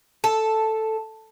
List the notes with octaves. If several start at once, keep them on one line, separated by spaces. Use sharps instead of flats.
A4